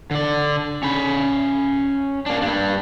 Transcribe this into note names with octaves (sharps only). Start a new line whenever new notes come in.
D3 D5
C#4 B5
A#3 D4
G2 D4